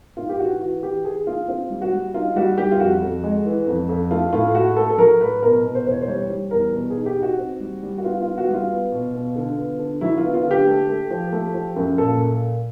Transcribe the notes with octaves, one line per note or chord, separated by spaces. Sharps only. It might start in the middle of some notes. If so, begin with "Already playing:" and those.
G#2 F4
G4
E3 F#4
E3 F#4
E3 G4
E3 G#4
A3 F4
C4 F4
G3
F#4
G3
D#4 F4
G3 F#4
G3 G4
F4
F2 F#4
F2
G#3
E3
F2
F2
A3 F4
A2 F4
A3 F#4
A3 A4
A4
F#3 A#4
A2 B4
B2 A#4
B2
C5
E2 C5
C#5
C5
G3 C#5
G3
E2 A#4
B2
D#4 G#4
G4
D#4
F#4
C4
G3
G3
F#4
B3 F4
F4
B3
F#4
G3
F4
B3
B2
B2
D3
B3
D3
F#3 E4
F4
B3
F4
D3
G4
A3
A3
F3
A3
F3
F#2
A#2 A4